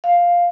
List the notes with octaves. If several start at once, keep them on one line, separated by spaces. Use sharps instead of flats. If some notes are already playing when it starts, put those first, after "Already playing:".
F5